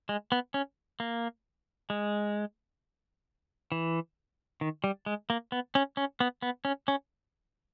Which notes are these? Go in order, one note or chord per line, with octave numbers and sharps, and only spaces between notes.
G#3
B3
C#4
A#3
G#3
E3
D#3
G3
G#3
A#3
B3
C#4
C#4
B3
B3
C#4
C#4